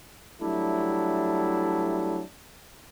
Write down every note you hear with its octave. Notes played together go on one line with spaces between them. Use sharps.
F#3 G3 A3 D4 E4